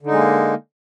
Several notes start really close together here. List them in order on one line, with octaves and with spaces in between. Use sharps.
D3 D#4 G#3 A#3